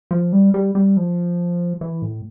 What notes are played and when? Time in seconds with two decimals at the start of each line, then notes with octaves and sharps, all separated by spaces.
0.11 F3
0.33 G3
0.54 G3
0.75 G3
0.97 F3
1.81 E3
2.02 A2